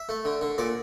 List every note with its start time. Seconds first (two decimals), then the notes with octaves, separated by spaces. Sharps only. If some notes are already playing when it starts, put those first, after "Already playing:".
Already playing: E5
0.09 A3
0.25 D3
0.41 D3
0.58 A#2 D5